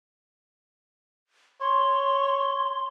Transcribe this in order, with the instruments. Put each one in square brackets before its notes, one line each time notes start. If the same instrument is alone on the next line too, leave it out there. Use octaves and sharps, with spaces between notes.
[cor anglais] C#5 [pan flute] C6